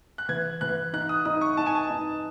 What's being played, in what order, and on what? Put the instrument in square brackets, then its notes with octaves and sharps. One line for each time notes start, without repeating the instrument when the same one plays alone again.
[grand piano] F#6
[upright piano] E3 [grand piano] G#6
[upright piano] E3 [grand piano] F#6
[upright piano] D#4 [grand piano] F#6
[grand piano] D#6
[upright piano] D#4 [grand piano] D#6
[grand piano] C#6
[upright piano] D#4 [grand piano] A5
[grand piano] G#5
A5
[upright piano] D#4